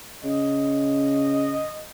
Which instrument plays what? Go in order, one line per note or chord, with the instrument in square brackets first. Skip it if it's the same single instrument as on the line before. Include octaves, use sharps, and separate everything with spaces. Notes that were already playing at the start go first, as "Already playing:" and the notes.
[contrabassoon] C#3 [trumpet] D#5